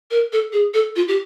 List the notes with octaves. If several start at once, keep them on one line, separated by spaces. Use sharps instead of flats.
A#4
A4
G#4
A4
F4
G4